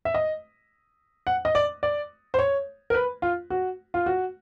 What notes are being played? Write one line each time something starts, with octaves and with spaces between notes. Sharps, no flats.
E5
D#5
F#5
D#5
D5
D5
C5
C#5
A#4
B4
F4
F#4
F4
F#4